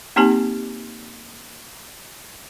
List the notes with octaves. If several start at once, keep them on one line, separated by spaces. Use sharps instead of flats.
A#3 C4 D#4 G4 G#5 A5